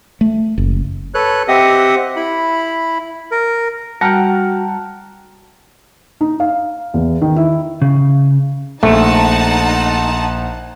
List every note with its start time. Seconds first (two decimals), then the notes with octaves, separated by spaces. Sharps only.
0.21 A3
0.58 F#1
1.14 A4 B4 C#5 F#6
1.48 C4 G4 D#5 E5 F#5 D#6
2.16 E4 B5
3.31 A#4
4.01 G3 F#4 F#5 G5 A5 A#5 F6
6.21 D#4
6.40 F5
6.94 E2
7.21 D#3
7.36 E4
7.82 C#3
8.83 A#1 A3 D#4 F#5 A5